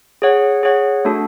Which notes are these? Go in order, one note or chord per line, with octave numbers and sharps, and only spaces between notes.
G#4 C#5 F#5
G#4 C#5 F#5
A3 D4 F#4 A4